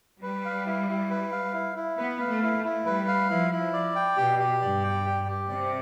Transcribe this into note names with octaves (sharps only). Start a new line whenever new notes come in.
G3 B4
F5
E4
E4
B4
F5
E4
E4
B3 B4
F5
A3
E4
A3
E4
G3 B4
F5
F3 E4
E4
D5
G5
B2 G4
G4
G2 D5
G5
G4
G4
C3 D5